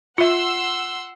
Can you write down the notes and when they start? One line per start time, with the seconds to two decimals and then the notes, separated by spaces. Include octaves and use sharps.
0.18 F4 E5 F#5 C6 E6